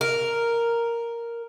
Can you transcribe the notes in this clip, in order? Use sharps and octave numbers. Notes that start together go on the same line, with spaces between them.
A#4